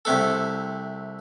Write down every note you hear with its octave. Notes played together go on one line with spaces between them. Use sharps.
C2 C3 A3 D4 A4